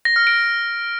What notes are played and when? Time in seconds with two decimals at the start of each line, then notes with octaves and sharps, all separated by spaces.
0.05 A#6
0.16 F6
0.27 D7